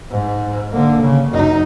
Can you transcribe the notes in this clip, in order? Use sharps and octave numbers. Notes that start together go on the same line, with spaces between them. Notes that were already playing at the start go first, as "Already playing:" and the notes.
G#2
D3 A#3
C#3
F#2 D#4